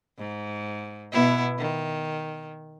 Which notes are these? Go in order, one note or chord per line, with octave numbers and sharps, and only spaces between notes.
G#2
B2 B3 E4
D#3